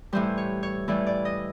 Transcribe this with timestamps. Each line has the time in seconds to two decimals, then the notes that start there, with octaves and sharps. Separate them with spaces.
0.13 A2 E3 G3 C5
0.38 C#5
0.63 C#5
0.88 A2 E3 G3 D5
1.07 D5
1.25 D#5